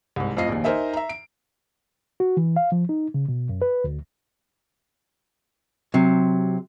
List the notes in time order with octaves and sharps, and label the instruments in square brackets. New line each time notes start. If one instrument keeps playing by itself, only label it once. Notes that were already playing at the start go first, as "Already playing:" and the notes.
[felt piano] C2 G#2
F2 A2 F4 D#5 C7
A#1 D#2
D#4 A#4 C5 D#5 E5 G#5
E5 A#5
D7
[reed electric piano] F#4
E3
F5
F3
D#4
C#3
B2
F#2
B4
D2
[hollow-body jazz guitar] C3 F#3